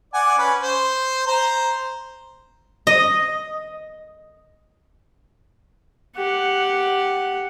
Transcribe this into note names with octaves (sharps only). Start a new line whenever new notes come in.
D5 F#5 G#5
C#4 B4
C5
C5 A#5
D#5
G4 F#5